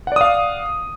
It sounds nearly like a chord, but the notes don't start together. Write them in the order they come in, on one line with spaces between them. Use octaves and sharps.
F#5 D5 D#6 F5